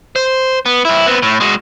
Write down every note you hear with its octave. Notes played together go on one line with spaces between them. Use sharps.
C5
B3
G2 E4
B3 C4
A2
G#3 F#4